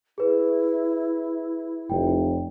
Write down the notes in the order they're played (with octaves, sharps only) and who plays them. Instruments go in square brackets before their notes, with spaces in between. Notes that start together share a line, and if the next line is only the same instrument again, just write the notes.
[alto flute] E4 [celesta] G#4 B4
[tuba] F1 [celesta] G5